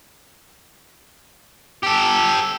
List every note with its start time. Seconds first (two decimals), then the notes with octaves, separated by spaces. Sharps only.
1.83 G4 A4